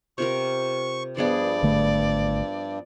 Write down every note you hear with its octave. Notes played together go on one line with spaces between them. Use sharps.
C3 F4 A#4 C#6
G2 F3 B3 G#4 D5
G#1 D3 A3